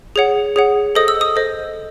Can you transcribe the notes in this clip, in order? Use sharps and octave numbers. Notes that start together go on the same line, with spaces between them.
G#4 C#5 F#5
G#4 C#5 F#5
A4 C5 D#5 D#6
E6
D#6
A4 C5 D#5